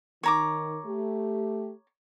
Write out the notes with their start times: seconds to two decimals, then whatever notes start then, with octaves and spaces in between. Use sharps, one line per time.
0.23 D#3 C#5 A#5 D6
0.85 A3 G4